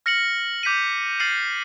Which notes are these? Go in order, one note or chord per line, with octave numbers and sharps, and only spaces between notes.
F6 A#6 C#7 F#7
D6 G6 B6 D#7 F#7
F6 A6 C7 D#7 F#7